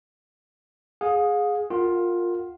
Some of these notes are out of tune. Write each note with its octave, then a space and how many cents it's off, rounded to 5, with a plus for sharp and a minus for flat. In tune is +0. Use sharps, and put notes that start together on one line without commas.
G#4 +0 F5 +40
F4 +10 A#4 -20 F#5 +25